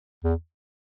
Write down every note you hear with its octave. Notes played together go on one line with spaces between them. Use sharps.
E2